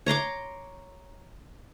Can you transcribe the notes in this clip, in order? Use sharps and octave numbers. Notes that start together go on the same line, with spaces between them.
C#5 A#5 C6 D6